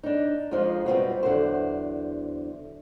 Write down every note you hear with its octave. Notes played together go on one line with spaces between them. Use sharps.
D4 D#4
F2 F3 G#3 D#4 F4
G3 B3 C4 D#4 F4 F#4
E2 D3 D#3 F#3 C5